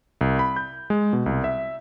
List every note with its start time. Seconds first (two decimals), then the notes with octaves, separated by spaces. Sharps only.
0.21 C2
0.39 B5
0.56 G6
0.90 G#3
1.13 B2
1.26 C2
1.44 E5